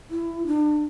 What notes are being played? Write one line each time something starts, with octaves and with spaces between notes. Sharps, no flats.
E4
D4